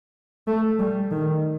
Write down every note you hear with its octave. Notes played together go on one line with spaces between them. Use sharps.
A3
G3
D#3